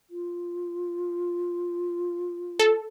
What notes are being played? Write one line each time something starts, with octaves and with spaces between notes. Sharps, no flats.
F4
A4